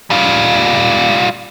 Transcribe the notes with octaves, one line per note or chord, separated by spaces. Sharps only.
G3 F4